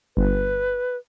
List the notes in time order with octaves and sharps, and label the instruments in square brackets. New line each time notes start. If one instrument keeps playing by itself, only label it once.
[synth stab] G1 [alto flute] B4